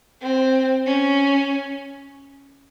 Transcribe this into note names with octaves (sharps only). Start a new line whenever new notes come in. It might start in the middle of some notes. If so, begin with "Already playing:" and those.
C4
C#4